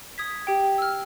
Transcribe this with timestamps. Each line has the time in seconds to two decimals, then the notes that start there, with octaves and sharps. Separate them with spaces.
0.18 D#6 G#6 B6
0.47 G4 G5
0.78 E6 F6